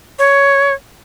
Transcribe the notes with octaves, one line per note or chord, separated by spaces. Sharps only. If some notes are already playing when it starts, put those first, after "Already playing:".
C#5